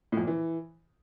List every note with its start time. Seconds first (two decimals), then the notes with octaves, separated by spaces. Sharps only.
0.12 A2
0.17 F2
0.22 A#2
0.27 E3